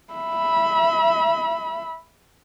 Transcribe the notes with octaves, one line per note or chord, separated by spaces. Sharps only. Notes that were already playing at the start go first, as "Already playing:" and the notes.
E5 B5